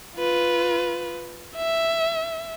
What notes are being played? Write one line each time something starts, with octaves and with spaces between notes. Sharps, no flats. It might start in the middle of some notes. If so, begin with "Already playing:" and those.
F4 B4
E5